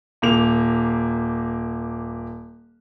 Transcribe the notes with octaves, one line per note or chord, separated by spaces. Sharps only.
D#1 A#3 F7